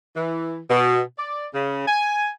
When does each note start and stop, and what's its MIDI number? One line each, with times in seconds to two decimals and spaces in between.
0.16 0.58 52
0.70 1.02 47
1.19 1.47 74
1.54 1.85 49
1.88 2.29 80